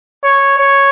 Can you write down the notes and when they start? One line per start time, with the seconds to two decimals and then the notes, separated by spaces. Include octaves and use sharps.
0.24 C#5
0.58 C#5